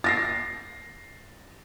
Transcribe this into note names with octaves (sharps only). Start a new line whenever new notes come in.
A6 A#6 C7